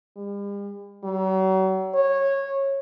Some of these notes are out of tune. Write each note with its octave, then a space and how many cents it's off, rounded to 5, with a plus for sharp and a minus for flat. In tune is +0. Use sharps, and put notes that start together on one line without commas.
G3 +45
F#3 +40
C#5 -15